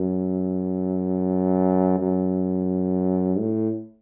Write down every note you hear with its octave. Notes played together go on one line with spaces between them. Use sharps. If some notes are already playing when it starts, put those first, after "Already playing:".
Already playing: F#2
F#2
A2